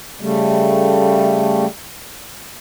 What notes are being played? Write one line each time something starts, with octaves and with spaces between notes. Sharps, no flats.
C#3 G3 A3